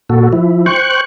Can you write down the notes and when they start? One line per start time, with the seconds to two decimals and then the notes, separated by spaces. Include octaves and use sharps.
0.09 A#2 F#4 A4
0.33 F3 E4
0.66 C5 G5 C#6 F#6